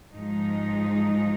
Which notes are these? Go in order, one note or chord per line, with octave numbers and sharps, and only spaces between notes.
G#2 F3 G#3 D#4